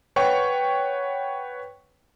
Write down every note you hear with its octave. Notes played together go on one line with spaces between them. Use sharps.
B4 C#5 F#5 G5 C#6